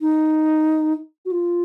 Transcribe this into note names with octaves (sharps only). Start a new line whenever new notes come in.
D#4
F#4
F4